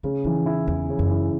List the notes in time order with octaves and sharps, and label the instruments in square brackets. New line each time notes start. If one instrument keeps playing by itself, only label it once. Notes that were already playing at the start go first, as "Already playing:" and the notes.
[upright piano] C#3 [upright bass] A3
[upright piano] E3 [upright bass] F#3
[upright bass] E2 [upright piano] E4
[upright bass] E2 [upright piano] E3
[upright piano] C#3
[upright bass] F#2
[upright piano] E4